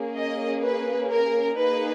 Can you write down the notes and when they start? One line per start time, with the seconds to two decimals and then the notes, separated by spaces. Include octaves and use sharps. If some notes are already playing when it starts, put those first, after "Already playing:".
Already playing: A#3 C#4 G#4
0.15 D#5
0.63 B4
1.11 A#4
1.58 A#3 D#4 G#4 B4